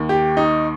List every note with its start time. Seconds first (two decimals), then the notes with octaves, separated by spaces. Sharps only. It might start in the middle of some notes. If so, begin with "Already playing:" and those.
Already playing: D#2 D#3
0.09 G4
0.37 D#4